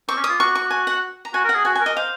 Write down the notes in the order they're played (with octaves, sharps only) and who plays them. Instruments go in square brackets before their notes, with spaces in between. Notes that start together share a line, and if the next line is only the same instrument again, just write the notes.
[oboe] C4 [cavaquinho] C#6
[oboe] C#4
[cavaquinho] D#6
[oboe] F4
[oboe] F#4 [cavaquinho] C#6
[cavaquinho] C#6
G#5
F#5
A#5
[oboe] F#4 [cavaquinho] G#5
[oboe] A#4
[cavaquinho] F#5
[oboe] G#4
[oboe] F#4 [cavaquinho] G#5
[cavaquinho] G#5
[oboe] A#4
[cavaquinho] D#5
[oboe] C5 [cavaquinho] F5